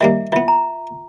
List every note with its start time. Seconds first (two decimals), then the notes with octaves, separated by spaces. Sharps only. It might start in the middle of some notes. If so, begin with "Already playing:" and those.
0.01 D#3 G3 A#3 E5
0.32 E3 B3 F4 E5
0.48 A#5